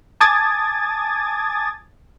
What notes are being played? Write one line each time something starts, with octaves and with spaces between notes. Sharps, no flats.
G#5 A5 D6 D#6 G#6 A6